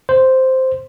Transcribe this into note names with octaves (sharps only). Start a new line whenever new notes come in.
C5